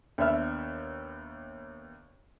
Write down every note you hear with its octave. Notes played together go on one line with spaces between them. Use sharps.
D#2 B3 D4 E5 F6